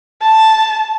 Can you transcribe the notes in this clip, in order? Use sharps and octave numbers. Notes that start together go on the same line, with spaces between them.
A5